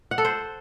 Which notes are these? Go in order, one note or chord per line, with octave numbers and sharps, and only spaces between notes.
F#5
A4
C5